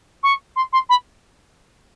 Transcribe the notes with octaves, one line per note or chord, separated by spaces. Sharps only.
C#6
C6
C6
B5